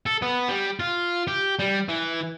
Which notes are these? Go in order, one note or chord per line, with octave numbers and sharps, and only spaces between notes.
A4
B3
G3
F4
G4
G3
E3